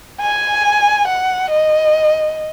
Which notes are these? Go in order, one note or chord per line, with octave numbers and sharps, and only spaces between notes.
G#5
F#5
D#5